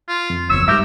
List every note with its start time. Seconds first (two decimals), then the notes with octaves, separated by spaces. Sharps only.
0.08 F4
0.30 F2
0.50 F#1 E2 C#5 E6
0.68 G#2 G3 A#4 E5 D6 G6